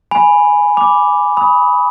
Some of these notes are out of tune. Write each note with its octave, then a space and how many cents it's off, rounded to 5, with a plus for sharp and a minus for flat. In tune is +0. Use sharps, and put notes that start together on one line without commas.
G#5 +0 B5 +0
B5 +0 D6 +0
B5 +0 D#6 +25